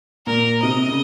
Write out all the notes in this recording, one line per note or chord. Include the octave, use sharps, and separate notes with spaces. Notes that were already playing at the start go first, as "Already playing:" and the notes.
A#2 A#4
C3 D#5
C#3